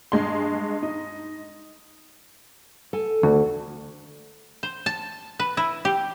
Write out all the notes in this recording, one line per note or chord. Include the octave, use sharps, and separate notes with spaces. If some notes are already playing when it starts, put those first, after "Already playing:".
G2 G#3 C6
D#4
A4 G#5
D2
C5
A5
B4
E4
G4